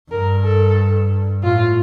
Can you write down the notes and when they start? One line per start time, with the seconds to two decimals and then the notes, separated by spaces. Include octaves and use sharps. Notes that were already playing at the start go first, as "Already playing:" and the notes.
0.11 G2 A#4
0.44 A4
1.43 A2 F4